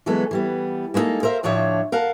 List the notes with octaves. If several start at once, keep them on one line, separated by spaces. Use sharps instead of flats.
E3 F#3 G#3 B3 A4
E3 G3 B3
G#3 A#3 B3 D#4 A4
A#4 C5 E5 F5
D2 A2 F3 D4 C#5 E5
A#4 F5 F#5 A5